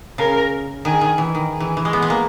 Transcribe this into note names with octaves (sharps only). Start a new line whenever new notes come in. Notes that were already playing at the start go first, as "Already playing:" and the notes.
C#3 A#4
D#3 G#4
D#3
E3
D#3
G#4
E3
E3
G#3
B3
G#3
A#3